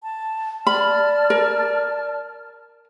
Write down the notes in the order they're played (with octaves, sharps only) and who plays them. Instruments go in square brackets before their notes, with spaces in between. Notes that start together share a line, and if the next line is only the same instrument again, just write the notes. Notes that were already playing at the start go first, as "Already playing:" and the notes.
[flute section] A5
[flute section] D5 A5 F6 [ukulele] B5
[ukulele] A#4